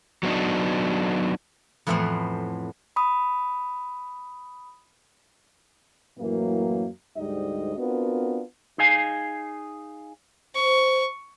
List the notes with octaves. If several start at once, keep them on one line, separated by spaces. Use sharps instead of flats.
F#3 B3 D4 D#4
F2 A2 E3 A3 B3 C5
B5 D#6
F#2 A2 E3 F#3 A#3
D2 G#2 G3 G#3 D#4 D#5
B3 C4 D4 F4 F#4 A#4
D#4 G#4 F5 G#5
C5 C#6